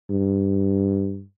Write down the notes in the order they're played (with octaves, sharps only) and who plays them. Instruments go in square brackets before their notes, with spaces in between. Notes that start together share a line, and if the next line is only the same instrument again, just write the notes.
[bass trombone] G2